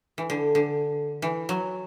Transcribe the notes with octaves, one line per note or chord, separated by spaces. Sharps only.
E3
D3
D3
E3
F#3